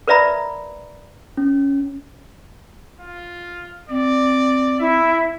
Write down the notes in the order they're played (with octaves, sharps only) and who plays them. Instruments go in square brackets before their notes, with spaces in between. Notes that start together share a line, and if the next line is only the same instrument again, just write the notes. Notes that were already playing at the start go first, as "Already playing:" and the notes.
[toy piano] A#4 B4 D5 E5 A#5 B5
[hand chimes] C#4
[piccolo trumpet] F4
[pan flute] C4 [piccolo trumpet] D5
[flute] E4 [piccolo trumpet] E5